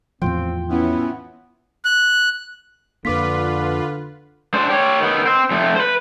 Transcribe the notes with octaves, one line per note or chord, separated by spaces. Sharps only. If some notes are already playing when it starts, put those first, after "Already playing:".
E2 A2 F3 C4 F4 G5
E3 B3 C#4 E4
F#6
F2 D3 A#3 F4 B4 D6 B6
D4 C5
G4 C#5
D#3 B3
C4
F2 A3
B4 C5